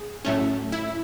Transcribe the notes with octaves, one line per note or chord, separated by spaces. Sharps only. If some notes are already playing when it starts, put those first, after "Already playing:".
Already playing: G#4
A2 F#3 A3 C#4
E4